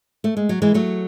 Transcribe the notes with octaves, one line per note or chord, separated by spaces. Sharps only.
A3
G#3
F#3
E3 G#3
F#3 A3